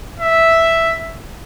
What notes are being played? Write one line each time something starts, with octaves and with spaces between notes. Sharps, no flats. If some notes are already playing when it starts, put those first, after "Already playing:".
E5